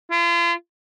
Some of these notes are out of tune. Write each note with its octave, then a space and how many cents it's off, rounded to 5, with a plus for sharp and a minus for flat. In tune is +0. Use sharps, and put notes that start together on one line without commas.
F4 -40